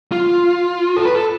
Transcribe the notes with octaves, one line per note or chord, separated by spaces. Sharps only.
F4
A4
B4
A4